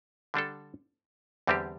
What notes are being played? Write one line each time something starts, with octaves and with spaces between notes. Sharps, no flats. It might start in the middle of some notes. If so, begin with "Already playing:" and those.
D3 G3 D4 A4
E2 D3 G3 C4 G4